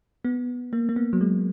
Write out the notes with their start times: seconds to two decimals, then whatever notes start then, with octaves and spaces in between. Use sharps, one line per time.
0.25 B3
0.73 A#3
0.89 A#3
0.96 B3
1.13 F#3
1.21 G#3